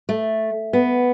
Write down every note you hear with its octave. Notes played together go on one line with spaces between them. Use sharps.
A3
B3